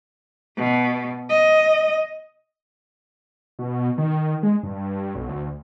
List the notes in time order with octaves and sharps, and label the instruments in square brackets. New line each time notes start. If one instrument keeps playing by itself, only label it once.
[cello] B2
D#5
[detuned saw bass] B2
D#3
G#3
G2
B1
D2